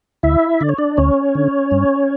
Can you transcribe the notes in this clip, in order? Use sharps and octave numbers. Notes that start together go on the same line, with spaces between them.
D2 E4 E5
D3 D5
C#5
D4 D5
D2 C#4 C#5
D3
G2